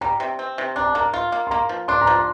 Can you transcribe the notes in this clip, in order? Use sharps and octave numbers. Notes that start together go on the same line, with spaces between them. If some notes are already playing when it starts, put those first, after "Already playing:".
G3 A#5
C3
C4
C3
D4 A#5
A5
A#3 A#5
F4 C6
A#3
C6
A#3 A#5
F3
D4 C6
A#5
F3
C6